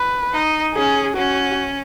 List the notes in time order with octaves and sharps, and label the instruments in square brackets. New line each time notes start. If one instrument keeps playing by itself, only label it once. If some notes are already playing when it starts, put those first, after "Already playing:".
Already playing: [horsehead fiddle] B4
[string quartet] D#4
[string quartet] C#4 [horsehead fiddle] G#4
[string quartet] C#4 [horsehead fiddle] F#4